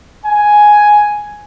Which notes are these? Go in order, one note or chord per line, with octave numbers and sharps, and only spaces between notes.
G#5